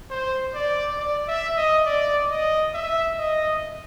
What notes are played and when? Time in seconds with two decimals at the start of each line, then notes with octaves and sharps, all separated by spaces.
0.11 C5
0.54 D5
0.98 D5
1.28 E5
1.57 D#5
1.86 D5
2.30 D#5
2.74 E5
3.18 D#5